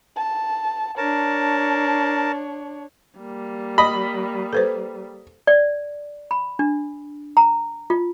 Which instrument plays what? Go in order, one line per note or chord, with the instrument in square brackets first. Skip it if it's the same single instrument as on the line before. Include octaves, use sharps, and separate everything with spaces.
[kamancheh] A5
[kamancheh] D4 C#5 [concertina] A#4 A5
[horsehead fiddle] G3 A#3
[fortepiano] D#5 B5
[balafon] A4 B4 C5
[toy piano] D5
B5
D4
A#5
F4